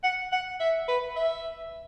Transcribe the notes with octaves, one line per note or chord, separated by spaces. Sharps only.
F#5
F#5
E5
B4
E5